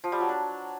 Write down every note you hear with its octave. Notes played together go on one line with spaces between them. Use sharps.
F3
G3
F#3
D4